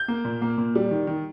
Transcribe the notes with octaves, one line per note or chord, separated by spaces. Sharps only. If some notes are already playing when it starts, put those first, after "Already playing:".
Already playing: G6
A#3
A#2
A#3
A#2
G3
D#3
D#3